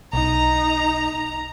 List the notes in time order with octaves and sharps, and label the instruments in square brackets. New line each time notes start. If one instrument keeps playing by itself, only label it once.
[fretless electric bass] B1 [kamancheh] D#4 [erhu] A#5